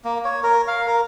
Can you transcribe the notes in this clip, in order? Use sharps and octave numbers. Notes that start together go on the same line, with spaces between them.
A#3
C#5
A#4
F5
A#4